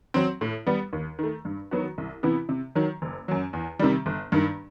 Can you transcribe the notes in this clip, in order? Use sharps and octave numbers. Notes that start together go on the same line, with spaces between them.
F#3 C4
A2
G3 B3
D#2
D#3 A3
G2
D#3 F#3 B3 F#4
C2
C3 E3 B3 E4
C3
D#3 F#3
F#1
F#2 F#3
E2
C3 D#3 G3
G1
G2 D#3